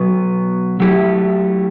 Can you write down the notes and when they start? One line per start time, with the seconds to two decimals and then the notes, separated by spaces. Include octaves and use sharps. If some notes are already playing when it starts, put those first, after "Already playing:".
Already playing: B2 F#3 B3
0.80 F#3 A3 E4 G4